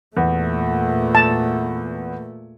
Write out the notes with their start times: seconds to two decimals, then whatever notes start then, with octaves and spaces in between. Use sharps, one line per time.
0.17 E2 A#2 A3
1.15 A5